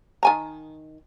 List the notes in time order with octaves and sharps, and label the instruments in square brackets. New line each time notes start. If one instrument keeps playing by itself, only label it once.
[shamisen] D#3 G#5 A#5